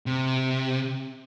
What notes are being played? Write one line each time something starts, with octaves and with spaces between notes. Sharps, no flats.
C3